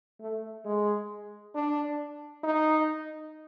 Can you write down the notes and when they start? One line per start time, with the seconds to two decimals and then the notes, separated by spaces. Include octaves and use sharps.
0.21 A3
0.65 G#3
1.55 D4
2.44 D#4